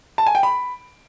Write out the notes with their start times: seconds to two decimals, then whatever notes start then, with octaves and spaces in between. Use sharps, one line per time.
0.18 A5
0.26 G#5
0.35 G5
0.43 B5